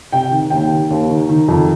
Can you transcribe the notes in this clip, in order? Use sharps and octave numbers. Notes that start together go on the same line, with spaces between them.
C3 G5
D#3
D#2 G5
D#3
D#2
D#3
D#3
F2